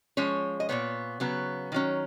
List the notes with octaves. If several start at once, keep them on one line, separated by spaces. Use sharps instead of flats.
F3 G#3 C#4 C#5
D#5
A#2 F3 B3 C#5
C#3 F#3 B3
D#3 F#3 C#4